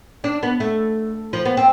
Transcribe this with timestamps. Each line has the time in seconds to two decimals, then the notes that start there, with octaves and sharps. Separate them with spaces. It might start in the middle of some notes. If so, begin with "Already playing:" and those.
0.24 D4
0.43 B3
0.60 A3
1.33 F3
1.45 B3
1.57 C4